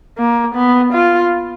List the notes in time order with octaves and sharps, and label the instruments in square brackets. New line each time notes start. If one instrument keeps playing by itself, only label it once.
[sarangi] A#3
B3
F4